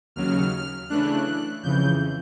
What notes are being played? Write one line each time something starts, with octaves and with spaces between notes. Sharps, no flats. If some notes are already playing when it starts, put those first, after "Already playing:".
D#2 C#3 F#3 F6
C#3 E3 A3 D4 F#6
F2 C#3 E3 G6